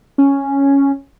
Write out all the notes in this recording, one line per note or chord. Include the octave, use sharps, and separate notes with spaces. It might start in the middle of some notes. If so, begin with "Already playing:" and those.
C#4